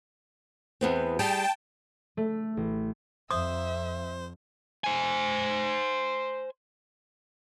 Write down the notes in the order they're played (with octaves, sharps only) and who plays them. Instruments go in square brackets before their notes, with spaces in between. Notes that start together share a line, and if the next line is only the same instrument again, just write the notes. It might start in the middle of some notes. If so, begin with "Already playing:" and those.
[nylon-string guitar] E2 B3 C4
[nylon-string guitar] G3 G#4 [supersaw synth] G5 A5
[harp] A3
A1
[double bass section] F2 [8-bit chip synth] C5 [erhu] E5 [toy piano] D#6
[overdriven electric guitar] C5 G#5